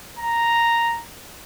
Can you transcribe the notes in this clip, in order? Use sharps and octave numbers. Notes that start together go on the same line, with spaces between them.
A#5